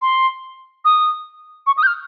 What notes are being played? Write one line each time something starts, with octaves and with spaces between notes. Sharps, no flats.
C6
D#6
C#6
D#6
G6
F6